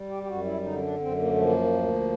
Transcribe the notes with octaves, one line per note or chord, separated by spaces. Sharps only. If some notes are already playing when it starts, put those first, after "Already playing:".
Already playing: G3
G4
G4
F#2 F#4
E4
D3 D#4
C#4
D4
F#2 C4
A#3
A3
F3 A#3
D2